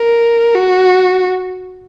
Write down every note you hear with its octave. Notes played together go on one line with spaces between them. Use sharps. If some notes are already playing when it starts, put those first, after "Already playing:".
Already playing: A#4
F#4